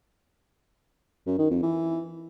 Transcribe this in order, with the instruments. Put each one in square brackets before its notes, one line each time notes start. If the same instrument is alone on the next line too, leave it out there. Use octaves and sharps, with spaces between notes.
[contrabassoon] F#2
D#3
F2
E3